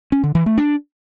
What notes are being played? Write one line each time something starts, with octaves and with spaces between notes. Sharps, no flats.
C#4
D3
E3
A3
D4